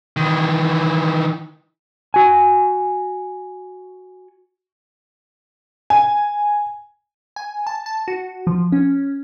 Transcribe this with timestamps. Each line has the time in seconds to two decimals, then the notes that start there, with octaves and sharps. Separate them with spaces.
0.17 D#3 E3
2.14 F#4 G#5
5.90 G#5
7.36 G#5
7.67 A5
7.86 A5
8.08 F#4
8.47 F3
8.72 C#4